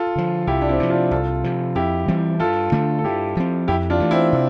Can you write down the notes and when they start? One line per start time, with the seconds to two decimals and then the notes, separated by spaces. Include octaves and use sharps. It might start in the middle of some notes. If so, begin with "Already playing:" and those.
Already playing: F4 A4
0.16 D3 F3
0.47 C2 E4 G4
0.62 D4
0.68 C4 E4
0.80 C3 F3
0.90 D4 F4
1.11 C2 F4 A4
1.44 C3 F3
1.75 F2 E4 G4
2.08 E3 G3 C4
2.40 G2 F4 A4
2.72 D3 A3 D4
2.99 A4
3.04 G2 E4 G4
3.37 F3 C4
3.68 F2 E4 G4
3.90 D4 F4
4.00 E3 A3
4.11 C4 E4
4.33 C3